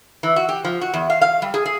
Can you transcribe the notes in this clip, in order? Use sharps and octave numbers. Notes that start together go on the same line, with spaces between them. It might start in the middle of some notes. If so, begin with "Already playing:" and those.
E3
F#4
G4
F3
F#4
E2
F5
F5
G3
G#4
G#4